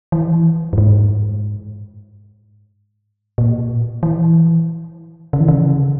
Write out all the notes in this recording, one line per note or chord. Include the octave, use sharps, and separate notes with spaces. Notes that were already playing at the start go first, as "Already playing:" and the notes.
E3
G2
G#2
A#2
E3
C#3
E3
C#3